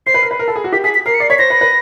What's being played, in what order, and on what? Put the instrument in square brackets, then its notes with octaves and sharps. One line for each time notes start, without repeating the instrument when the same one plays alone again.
[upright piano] C5 [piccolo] C7
[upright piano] B4
A#4
B4
A#4
A4
G#4
F#4
[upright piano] G4 [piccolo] B6
[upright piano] G#4 [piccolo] B6
[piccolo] B6
[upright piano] A#4 [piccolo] C7
[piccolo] C#7
[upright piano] D5 [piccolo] C7
[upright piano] C#5 [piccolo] B6
[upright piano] C5 [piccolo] A#6
[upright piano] B4
B4